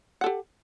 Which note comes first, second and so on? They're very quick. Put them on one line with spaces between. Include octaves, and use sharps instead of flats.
F#5 A4 G4